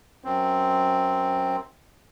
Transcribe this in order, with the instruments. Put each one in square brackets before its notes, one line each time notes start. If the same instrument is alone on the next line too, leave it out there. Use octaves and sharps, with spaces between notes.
[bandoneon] F#2 C4